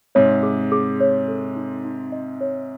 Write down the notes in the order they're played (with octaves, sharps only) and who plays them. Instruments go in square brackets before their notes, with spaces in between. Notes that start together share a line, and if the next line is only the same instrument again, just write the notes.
[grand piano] G#2 C3 [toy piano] C#5
[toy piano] G#4
G#4
C#5
A4
D#4
D#4
D#5
C#5